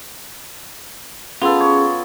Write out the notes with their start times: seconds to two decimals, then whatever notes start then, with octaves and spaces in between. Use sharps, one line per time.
1.42 B3 C#4 F4 G#4 A4
1.60 C#5